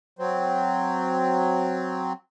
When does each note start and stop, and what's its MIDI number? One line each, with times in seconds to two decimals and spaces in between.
0.19 2.13 54
0.19 2.13 60